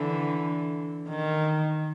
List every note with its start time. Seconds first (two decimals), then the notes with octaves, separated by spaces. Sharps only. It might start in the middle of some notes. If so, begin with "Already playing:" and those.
Already playing: D3 E3
1.09 D#3